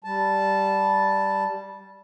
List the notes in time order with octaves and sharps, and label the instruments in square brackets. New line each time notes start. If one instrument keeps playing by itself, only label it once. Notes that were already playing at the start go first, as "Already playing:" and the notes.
[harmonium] G3 A5